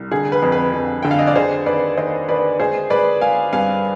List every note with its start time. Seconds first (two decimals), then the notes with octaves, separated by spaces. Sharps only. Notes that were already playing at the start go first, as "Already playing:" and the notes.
Already playing: C2
0.11 D3 G#4
0.32 B4
0.42 F2
0.52 B4
0.74 F2
1.03 D3 G5
1.11 F5
1.19 D#5
1.27 D5
1.36 D3 G#4 C5
1.66 D#2 B4 D5
1.97 D#2 C5 D#5
2.28 D#2 B4 D5
2.60 G#3 G#4 C5
2.90 G#3 B4 D5
3.21 G#3 F5 G#5
3.53 G2 F5 G#5